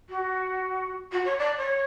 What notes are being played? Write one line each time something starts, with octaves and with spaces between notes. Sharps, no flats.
F#4
F#4
C#5
D5
C#5